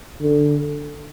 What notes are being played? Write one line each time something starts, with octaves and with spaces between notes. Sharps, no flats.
D3